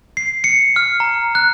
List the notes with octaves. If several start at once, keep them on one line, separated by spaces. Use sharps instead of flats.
C7
C#7
F6
A#5
F#6